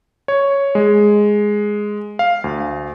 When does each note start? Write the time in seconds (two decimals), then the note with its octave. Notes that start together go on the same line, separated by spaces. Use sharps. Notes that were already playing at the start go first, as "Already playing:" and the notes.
0.28 C#5
0.75 G#3
2.19 F5
2.44 D2